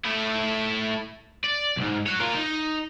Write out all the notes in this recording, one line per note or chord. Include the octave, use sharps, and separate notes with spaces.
A3 E4
D5
B1 G#2
C#5 F#5
F4 A#4
D#4